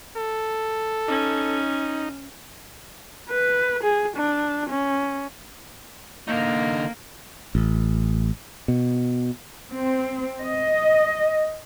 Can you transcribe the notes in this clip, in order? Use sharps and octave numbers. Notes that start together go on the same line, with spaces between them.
A4
C#4 D#4
B4
G#4
D4
C#4
D3 A#3 D#4
A1
B2
C4
D#5